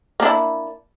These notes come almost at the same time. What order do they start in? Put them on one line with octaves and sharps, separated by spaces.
A#3 D4 E4